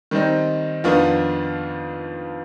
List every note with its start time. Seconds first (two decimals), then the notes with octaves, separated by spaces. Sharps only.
0.11 D#3 G3 C4 D#4
0.84 F2 D#3 B3 D4 F4